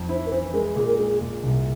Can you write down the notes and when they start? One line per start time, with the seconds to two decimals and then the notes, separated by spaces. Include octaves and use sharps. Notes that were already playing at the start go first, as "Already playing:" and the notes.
Already playing: F2
0.09 E4 C5
0.26 A#4
0.31 E3 C5
0.53 G#3 A#4
0.76 A#2 G#4
0.87 A#4
0.97 G#3 G#4
1.21 A#2
1.43 C2